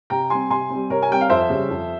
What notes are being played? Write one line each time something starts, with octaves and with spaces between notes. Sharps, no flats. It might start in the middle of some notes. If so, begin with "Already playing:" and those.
C3 G5 A#5
G3 C4 G#5 C6
C3 G#5 C6
G3 C4
C3 A#4 C#5
G#5
G3 C4 G5
F5
F2 C5 E5
C#3 G3
F2